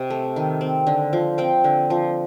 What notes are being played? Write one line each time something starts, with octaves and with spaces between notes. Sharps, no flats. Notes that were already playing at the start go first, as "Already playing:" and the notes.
Already playing: C3 D#5
A3
D#3
C4
D3
F3
C4 G5
D3
F3